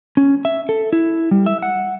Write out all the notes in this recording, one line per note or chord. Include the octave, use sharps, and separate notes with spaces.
C#4
E5
A4
E4
G3
E5
F#5